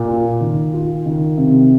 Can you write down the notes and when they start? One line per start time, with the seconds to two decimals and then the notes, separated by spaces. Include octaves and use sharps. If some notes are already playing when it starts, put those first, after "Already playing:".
Already playing: A#2
0.08 F4
0.40 D#3
0.74 F4
1.05 D#3
1.37 C3